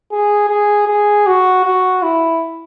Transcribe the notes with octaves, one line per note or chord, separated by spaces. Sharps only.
G#4
G#4
G#4
F#4
F#4
E4